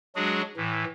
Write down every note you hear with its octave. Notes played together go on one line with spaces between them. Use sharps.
F#3 G#3 D4 F#4 G#4
A2 E3